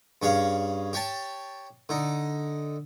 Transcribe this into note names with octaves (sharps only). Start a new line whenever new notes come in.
G2 C#4 G#4 C#5 F5
G4 C#5 G5 A5
D3 D#4